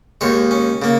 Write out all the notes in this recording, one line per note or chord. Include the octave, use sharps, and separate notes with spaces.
D#2 D#3 G#3 C#5
C#4
C#3 A#3